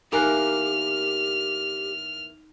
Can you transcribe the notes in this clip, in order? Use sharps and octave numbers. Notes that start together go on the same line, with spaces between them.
E2 A#3 D#4 G4 A#4 G#5 F6 F#6